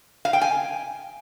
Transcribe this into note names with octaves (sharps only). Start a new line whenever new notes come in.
F5
G5
G#5